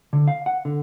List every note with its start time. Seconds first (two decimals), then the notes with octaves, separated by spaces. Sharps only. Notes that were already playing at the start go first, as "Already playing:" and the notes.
0.13 D3
0.27 F5
0.46 F#5
0.65 D3